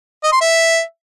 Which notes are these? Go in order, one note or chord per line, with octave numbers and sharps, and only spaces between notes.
D#5
C6
E5